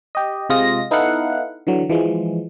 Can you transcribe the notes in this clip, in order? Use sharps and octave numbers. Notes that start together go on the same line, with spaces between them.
G4 D#5
C3 G#3 F4 D#5 A#6
B3 D#4 E4 A4 F5 F#5
D3 E3 F#3
E3 F3 G#3